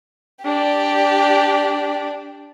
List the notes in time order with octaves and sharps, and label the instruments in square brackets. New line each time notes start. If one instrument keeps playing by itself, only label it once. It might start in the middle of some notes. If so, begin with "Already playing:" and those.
[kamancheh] D4 D5 [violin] G4